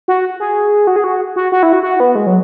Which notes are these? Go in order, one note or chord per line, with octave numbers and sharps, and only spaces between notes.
F#4
G#4
F#4
G#4
F#4
F#4
F#4
E4
F#4
F#4
B3
G#3
F#3